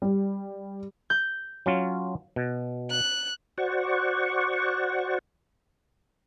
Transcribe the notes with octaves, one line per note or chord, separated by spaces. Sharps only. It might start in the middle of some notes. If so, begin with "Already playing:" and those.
G3
G6
F#3 C#4 F4
B2
F#6
F#4 C5 D5 F#5 C#6